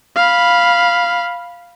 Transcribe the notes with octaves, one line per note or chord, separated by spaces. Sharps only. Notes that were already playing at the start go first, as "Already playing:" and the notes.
F5 B5